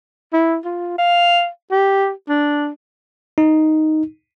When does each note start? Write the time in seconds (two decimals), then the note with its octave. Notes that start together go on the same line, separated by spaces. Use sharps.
0.33 E4
0.65 F4
0.98 F5
1.71 G4
2.29 D4
3.38 D#4